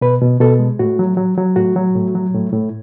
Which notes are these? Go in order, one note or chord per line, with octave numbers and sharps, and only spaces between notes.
B2 B4
B2
B2 A4
G#3
A2 F#4
F#3
F#3
F#3
A2 F#4
F#3
A2
F#3
A2
A2